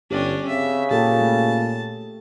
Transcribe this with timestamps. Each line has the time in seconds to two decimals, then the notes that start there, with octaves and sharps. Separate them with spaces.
0.11 G1 C#4 D4 G4
0.49 C#3 C4 E5
0.91 A#2 G4 A4 A5
1.21 A3